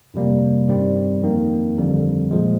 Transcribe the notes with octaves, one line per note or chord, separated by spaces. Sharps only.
G1 F2 C3 G3 A#3
G2 D#3 G3 C4
F2 D#3 A#3
G1 F2 D3 G3
A#2 F3 G#3